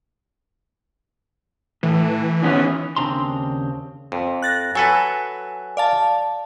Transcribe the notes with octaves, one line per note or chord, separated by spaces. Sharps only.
A2 E3
D#3 B3 C#4
D#2 C#3 C4 D4 A#5 C6
F2
F#6 A6 A#6
F#3 A4 B4 G#5
D5 F5 A5